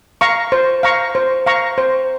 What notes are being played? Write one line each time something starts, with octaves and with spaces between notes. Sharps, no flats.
F5 A#5 C#6
C5
F5 A#5 C#6
C5
F5 A#5 C#6
C5